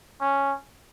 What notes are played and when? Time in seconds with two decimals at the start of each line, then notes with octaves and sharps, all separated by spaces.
0.21 C#4